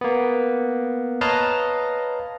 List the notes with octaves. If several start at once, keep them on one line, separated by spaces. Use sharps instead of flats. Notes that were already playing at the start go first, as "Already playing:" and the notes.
A#3 B3
B4 C#5 D#5 F5 A5 A#5